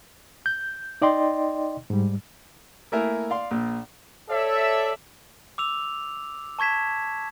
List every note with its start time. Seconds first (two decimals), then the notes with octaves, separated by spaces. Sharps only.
0.46 G6
1.02 D#4 D5 D#5 G5 C6
1.90 G#2 G3
2.92 A3 A#3 E4 A#4 E5 G#5
3.30 D5 F5 C6
3.51 A#1 A#2
4.30 A4 C#5 D5 E5
5.58 D6 E6 F7
6.59 A5 C#6 G#6 B6 E7